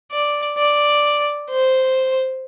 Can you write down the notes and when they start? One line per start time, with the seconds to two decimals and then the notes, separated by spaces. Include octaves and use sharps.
0.12 D5
0.58 D5
1.50 C5